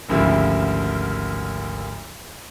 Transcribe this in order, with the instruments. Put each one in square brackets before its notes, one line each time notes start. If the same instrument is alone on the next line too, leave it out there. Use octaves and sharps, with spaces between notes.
[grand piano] G#1 D2 C#3 F3 G3 E4